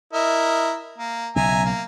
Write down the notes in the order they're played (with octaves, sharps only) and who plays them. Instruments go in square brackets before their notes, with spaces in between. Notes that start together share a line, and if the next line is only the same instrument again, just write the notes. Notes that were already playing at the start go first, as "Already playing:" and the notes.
[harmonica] E4 A#4 D#5
A#3
[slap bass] B1 C#3 [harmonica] E5 G#5 A#5
[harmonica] A#3